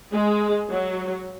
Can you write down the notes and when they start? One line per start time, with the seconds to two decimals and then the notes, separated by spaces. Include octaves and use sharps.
0.12 G#3
0.70 F#3